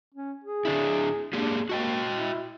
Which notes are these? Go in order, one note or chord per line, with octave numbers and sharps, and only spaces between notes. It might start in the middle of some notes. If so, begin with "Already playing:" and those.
C#4
G#4
D3 D4 E4
A#3 D4 G4 G#4
A#3 F#4 D#5 G5
E4